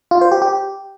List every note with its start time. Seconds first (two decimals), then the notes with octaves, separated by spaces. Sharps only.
0.11 F4
0.21 C5
0.32 G4
0.42 G4